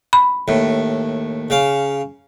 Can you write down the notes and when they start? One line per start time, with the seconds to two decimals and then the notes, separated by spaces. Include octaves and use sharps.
0.13 B5
0.48 D#2 A2
1.50 C#3 F5